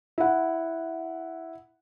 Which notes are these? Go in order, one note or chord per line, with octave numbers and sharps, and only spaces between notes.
E4 F#5